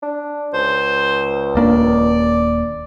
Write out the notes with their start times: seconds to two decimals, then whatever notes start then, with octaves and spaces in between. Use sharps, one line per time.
0.03 D4
0.54 C#2 C5
1.55 D#1 A#3 D4 D5